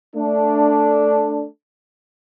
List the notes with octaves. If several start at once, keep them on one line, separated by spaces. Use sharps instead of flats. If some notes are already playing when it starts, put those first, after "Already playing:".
A3 D4